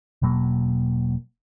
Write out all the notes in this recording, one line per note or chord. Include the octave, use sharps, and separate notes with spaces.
E1 B2 F#3 A#3